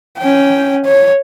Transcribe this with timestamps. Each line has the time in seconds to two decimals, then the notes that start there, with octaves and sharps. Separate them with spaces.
0.18 C#4 G5
0.85 C#5